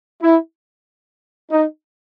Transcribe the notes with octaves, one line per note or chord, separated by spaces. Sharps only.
E4
D#4